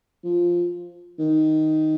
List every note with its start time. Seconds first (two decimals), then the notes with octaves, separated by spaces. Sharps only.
0.24 F3
1.19 D#3